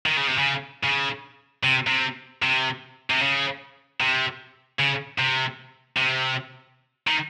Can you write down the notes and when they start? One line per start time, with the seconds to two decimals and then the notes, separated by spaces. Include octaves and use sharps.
0.06 D#3
0.17 C#3
0.28 C3
0.39 C#3
0.84 C#3
1.63 C3
1.87 C3
2.43 C3
3.10 C3
3.21 C#3
4.01 C3
4.80 C#3
5.19 C3
5.97 C3
7.07 D#3